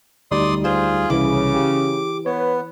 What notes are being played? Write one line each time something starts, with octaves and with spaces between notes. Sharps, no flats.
D2 G3 D#4 D5 C6 D#6
F4 G#4 C5 C6
C2 C#3 E3 D6
G4
B3 B4 C#5